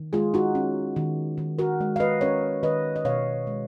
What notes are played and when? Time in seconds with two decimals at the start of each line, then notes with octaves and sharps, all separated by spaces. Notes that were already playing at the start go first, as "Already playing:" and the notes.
Already playing: D#3
0.13 G#3 F4 G#4
0.34 D#4 F#4
0.55 C#4
0.96 D#3
1.38 D#3
1.59 F#4 A#4
1.80 G#3
1.96 F5
2.00 B4 D#5
2.21 C#4 A#4 C#5
2.63 D#3 B4 D#5
2.96 D#5
3.05 B2 C#5 F5
3.47 G#3